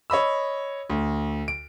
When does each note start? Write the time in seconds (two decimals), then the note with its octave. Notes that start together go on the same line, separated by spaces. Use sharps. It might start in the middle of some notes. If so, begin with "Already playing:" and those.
0.10 C#5 D#5 B5 E6
0.90 D2
1.48 D7